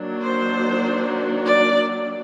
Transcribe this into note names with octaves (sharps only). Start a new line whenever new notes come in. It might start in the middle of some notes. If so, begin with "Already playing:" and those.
Already playing: D#3 F#3 A#3 D4
C5
D5